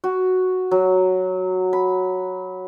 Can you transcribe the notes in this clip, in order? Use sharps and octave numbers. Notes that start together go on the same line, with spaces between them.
F#4
F#3
B5